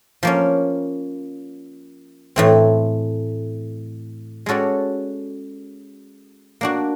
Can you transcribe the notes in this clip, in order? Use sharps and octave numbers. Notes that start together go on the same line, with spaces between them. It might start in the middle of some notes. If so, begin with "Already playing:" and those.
F3 A#3 C#4
A2 E3 A3 C4
G#3 C#4 F#4 A4 D5
A#3 D4 F#4